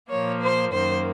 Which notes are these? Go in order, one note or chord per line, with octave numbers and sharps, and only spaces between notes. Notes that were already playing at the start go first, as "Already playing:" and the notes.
A#2 F3 A#3 C#5
C5
F#2 D#3 A#3 C5